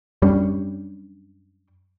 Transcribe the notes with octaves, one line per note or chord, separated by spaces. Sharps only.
F#2 G3 C#4 D4